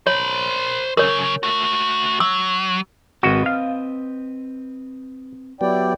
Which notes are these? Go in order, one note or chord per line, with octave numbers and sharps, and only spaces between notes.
C5 C#5 B5
C#3 F#3 A#4 C#5
A3 F#4
F#3 E6
G#1 C4 F#4 B4 D#5
F5
F#3 B3 E4 G4 D5 G5